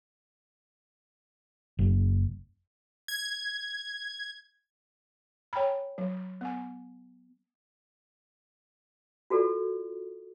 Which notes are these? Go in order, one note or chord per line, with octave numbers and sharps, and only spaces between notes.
F#1
G#6
C#5 G5 G#5 A#5 B5
F#3
B3 G#5
F4 F#4 A4 A#4 D5